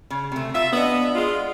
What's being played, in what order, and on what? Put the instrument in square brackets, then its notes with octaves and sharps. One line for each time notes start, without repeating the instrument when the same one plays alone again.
[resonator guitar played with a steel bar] C#3
C3 A3
[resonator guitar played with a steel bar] F4 [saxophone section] E5
[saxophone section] B3 [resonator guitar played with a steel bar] D4 D#5
[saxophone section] G#3 F4